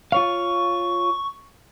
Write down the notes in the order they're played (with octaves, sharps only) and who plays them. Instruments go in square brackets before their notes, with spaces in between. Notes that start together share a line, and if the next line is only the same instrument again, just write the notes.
[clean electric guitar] F4 C#5 F5 [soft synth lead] C#6